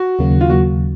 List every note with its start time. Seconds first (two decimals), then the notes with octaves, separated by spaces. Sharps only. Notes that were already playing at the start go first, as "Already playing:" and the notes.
Already playing: F#4
0.19 D#2 C#3 F#3 A#3
0.41 F4
0.50 F#3 A#3 F#4